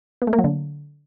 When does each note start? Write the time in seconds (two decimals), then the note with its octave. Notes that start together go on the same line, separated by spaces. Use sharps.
0.22 B3
0.27 A3
0.33 A#3
0.39 F#3
0.44 D3